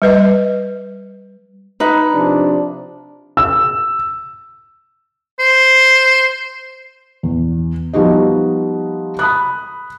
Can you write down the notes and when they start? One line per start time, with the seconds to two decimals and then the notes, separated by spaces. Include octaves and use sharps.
0.02 G3 B4 D#5
1.80 D#4 B4
2.12 C3 F3 D4
3.37 E6
5.39 C5
7.23 E2
7.93 F3 G3 B3 D#4 F#4 D#5
9.19 B5 D#6 F#6